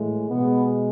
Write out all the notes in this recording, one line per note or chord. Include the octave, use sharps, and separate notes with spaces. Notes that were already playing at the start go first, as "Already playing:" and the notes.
Already playing: A2 E3 G#3
B2 G#3 B3